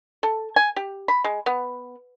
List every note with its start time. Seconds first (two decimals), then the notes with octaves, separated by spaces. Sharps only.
0.23 A4
0.56 G#5
0.76 G4
1.08 B5
1.24 G#3
1.46 B3